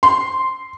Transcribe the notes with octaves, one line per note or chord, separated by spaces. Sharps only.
C6